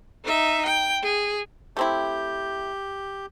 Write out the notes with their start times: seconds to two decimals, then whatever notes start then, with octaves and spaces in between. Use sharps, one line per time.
0.24 D#4 E5
0.66 G5
1.02 G#4
1.77 A3 C4 E4 G4 G6